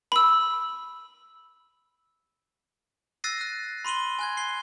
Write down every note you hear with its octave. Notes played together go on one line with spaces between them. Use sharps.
B5 E6
E6 F#6 A6 A#6 C7 D#7
F#6
B5 C6 D#7 F#7 G7
G#5 F#6 G#6
C7 G7